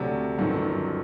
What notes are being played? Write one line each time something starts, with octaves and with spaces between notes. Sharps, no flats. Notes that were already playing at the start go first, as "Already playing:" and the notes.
Already playing: D2 C3 F#3 D4
G1 F#2 D#3 F#3